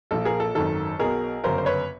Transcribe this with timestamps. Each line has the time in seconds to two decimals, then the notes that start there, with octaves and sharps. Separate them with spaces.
0.11 A#1 A#2 F3 A4
0.25 G#4 A#4
0.40 A4
0.55 G#1 F#2 D#3 A4
0.99 B1 B2 G#4 A#4
1.44 G1 F#2 C#3 A#4 C5
1.58 C5
1.66 B4 C#5